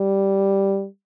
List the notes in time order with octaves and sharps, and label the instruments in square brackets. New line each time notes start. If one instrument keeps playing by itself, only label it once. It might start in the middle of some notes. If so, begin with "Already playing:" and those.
Already playing: [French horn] G3